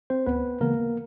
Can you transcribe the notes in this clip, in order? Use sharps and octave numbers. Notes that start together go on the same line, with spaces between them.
C4 C5
D2 B3 B4
C#3 E3 G#3 A#3 B3 A#4